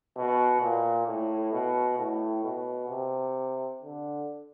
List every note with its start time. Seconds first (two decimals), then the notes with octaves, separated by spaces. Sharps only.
0.16 B2
0.61 A#2
1.07 A2
1.53 B2
1.98 A2
2.44 B2
2.89 C3
3.82 D3